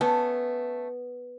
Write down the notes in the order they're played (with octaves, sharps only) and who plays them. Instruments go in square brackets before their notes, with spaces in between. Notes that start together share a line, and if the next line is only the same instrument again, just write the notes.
[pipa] A3 C#4 A5 [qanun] B3